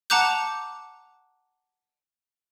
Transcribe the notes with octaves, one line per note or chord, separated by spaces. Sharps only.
F#5 A5 A#5 D6 F#6 G6